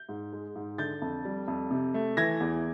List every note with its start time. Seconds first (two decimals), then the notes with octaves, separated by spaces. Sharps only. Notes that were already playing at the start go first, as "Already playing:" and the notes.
Already playing: G6
0.09 G#2
0.33 G#3
0.55 G#2
0.78 D3 G6 A6
1.02 F2
1.25 G3
1.48 F2
1.71 C3
1.94 A3
2.17 E3 G#6 A#6
2.40 E2